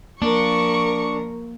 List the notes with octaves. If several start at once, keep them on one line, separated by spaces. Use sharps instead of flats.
F3 A#3 D4 A#4 C#6